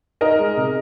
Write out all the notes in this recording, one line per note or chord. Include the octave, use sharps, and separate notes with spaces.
D#4 A#4 D#5
G#3
C3